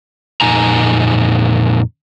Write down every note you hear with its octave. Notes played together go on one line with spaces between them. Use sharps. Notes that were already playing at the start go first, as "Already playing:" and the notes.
F2 A#2 D#4 G#5 A#5